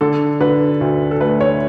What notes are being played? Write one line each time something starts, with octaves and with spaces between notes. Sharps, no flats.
D3 A4
D3 B4
D2
A4
A3 B4
C#5